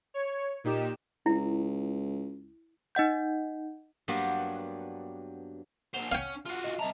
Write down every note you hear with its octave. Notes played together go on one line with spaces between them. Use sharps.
C#5
A#2 D#4 G4 E7
C#2 E4
D#4 D#5 F#5 G6
G2 F#3 G3 A#3 B3 D4
A#2 C5 F#5 F7 G7
C#4 F5 G5
F4 F#4 F6
D#5
C2 D#5 E5 A5 A#5